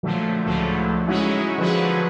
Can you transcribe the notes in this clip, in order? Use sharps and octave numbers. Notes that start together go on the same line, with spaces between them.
A#2 D3 F3 F#3 A3
C#2 A2 D3 F3 F#3 A3
F#3 G#3 C#4 D#4 E4 F#4
D3 F3 F#3 F#4 G#4 B4